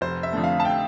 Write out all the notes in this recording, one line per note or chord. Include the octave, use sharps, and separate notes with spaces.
F1 C5
E5
F2 D3 A3
F5
A5
G5